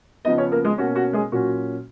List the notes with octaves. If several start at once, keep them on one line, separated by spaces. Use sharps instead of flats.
C#3 F3 B3 D#4 D#5
C#4 C#5
A#3 A#4
G#3 G#4
B2 A#3 C#4 F#4
F#4
G#3 G#4
A#2 F#3 C#4 F#4